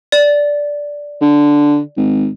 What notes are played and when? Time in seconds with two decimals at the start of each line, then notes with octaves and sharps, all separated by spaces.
0.12 D5
1.21 D3
1.97 G#1